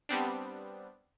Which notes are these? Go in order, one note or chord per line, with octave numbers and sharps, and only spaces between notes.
G3 B3 C4 D4